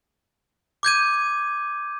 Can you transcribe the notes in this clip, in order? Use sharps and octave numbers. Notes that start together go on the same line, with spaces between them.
D6 G6 G#6 D#7